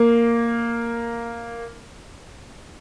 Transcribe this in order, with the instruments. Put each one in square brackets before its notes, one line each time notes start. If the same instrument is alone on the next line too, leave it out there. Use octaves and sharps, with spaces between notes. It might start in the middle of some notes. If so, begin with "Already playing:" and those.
Already playing: [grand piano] A#3